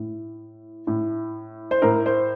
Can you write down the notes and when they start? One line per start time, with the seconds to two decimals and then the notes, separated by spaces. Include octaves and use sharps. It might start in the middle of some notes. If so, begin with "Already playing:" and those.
Already playing: A2
0.87 A2
1.71 C5
1.82 A2 A#4
2.06 C5